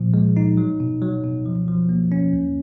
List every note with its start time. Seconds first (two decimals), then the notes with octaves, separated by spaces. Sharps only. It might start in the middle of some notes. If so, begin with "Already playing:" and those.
Already playing: A#2 F3
0.14 G#3
0.37 D#4
0.57 F#3
0.80 B2
1.02 F#3
1.24 B2
1.46 F3
1.68 F3
1.89 A#3
2.12 C#4
2.33 D#2